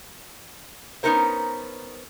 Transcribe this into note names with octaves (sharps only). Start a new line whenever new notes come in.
B3 C#4 D#4 A4 A#4 C5